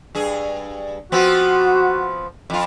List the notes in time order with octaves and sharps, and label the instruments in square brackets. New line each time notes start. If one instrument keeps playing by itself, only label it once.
[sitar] G2 G#4
[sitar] F3 B3 C4 [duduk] F#4
[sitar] F2 F4